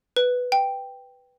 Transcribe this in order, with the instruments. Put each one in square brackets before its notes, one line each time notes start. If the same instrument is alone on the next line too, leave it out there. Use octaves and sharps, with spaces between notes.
[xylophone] B4
G5